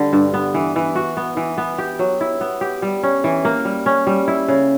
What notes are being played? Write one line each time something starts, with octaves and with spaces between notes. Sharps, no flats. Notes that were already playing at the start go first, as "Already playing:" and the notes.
Already playing: D3 G3
G2
B3
E3
E3
F#4
B3
E3
B3
G4
F#3
E4
B3
G4
G3
C#4
E3
A#3
G3
C#4
G3
E4
C#3